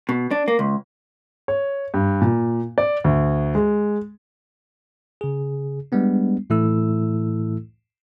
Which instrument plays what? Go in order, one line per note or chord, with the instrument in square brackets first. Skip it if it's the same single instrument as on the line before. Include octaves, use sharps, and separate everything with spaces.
[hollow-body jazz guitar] B2
D4
A#3
C#2
[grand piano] C#5
G2
A#2
D5
D2
G#3
[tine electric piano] C#3 G#4
G3 G#3 B3 D4
A2 E3 A3 E4 A4 E6